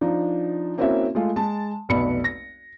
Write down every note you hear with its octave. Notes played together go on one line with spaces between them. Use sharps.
F3 D4 D#4
A#3 C4 C#4 E4 F#4 E5
G#3 A3 F4
G#3 A5
F1 B1 B3 D5 B5 C#7
A#6